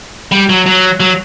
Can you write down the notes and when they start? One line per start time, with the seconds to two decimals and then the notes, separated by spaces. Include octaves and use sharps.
0.32 G3
0.49 F#3
0.66 F#3
1.00 F#3